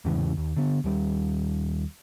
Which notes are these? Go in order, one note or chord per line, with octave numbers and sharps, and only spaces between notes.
E2 G#2 C#3 E3
D#2
D3 B3
D#2 G3